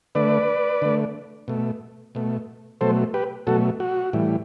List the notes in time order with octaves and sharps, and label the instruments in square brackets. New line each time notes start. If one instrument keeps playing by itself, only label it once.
[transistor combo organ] D3 A3 B4 D5
D3 A3
B2 A3
B2 A3
B2 F#3 A3 A4 C5
G4 B4
B2 F#3 A3 F#4 A4
F#4
A2 E3 G3